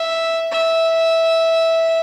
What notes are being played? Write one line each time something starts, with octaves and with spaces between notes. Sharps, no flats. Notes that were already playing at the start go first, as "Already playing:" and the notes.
Already playing: E5
E5